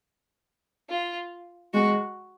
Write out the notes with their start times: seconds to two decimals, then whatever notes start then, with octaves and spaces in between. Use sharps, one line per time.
0.90 F4
1.74 G#3 F#4